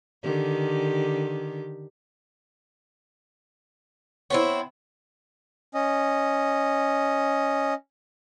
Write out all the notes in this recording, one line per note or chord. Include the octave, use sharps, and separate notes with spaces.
D3 D#3 G4
B3 C4 E4 C#5
C#4 D#5